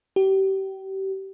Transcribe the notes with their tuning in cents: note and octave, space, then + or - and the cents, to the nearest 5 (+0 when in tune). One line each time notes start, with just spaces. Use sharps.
G4 -30